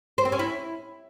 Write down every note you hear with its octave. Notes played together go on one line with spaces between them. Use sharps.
C5
C4
C#4
E4